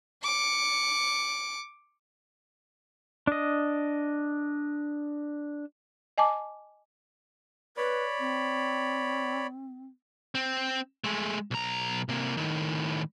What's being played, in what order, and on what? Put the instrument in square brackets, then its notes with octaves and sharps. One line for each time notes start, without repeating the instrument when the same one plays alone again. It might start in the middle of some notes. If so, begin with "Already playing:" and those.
[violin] D6 C#7
[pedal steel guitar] D4 D#5
[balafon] D#5 G#5 A5 D6
[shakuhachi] B4 [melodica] C#5 D5 B5
[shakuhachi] C4
[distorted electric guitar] C4
G#3 A3
B1 A#5
C3 A#3
A2 D#3